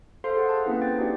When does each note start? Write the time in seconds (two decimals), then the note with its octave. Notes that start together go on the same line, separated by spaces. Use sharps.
0.24 A4 C5 F5 C6 C7
0.37 G#4 F#5
0.49 A5
0.65 A#3 C4 C#4 E4 B4
0.81 C4 G5 A6
0.99 D4 D#4 F#4 G4 D5